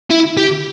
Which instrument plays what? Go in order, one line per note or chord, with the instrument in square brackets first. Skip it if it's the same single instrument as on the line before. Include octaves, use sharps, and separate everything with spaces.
[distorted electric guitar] E4
G4